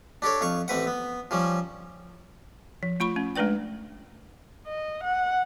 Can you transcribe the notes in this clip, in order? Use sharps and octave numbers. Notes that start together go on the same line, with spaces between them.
D4 G4 A4 C#5
F2 F5 C#6
A1 C4 B4 F#5
B3
F3 G3 C#4
F3
A3 F4 B5 C#6
A3 C#4
G#3 A3 D4 B4 D5 G5
D#5
F#5